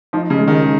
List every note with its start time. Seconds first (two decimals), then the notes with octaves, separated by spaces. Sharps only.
0.13 F3 D#4
0.30 C#3
0.39 G#3
0.48 D#3